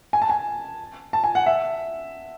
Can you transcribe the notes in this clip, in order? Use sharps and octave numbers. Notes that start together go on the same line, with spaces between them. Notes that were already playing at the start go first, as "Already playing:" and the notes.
G#5
A5
G#5
A5
G#5
F#5
E5